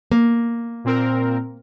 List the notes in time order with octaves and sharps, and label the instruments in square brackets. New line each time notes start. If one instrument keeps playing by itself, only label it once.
[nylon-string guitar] A#3
[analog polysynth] A#2 C4 A#4